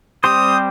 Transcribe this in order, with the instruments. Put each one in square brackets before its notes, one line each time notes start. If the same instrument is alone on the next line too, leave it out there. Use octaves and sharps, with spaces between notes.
[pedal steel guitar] G3 C4 G4 C5 [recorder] D#6